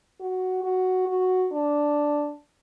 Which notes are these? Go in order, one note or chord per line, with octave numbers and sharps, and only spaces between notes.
F#4
F#4
F#4
D4